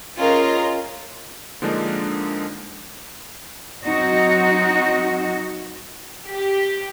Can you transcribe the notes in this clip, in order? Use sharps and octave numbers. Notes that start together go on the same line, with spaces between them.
C#4 F4 G#4 A#4 D#5
D3 F3 G#3 A#3 D4 D#4
F#3 C4 D#4 F#4
G4